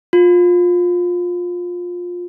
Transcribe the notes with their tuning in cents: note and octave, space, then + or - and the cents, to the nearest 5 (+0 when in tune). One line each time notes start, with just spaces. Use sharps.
F4 +20